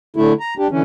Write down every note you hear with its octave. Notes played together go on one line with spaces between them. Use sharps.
D3 A3 E4
A#5
D4 G4
D3 E3 C#4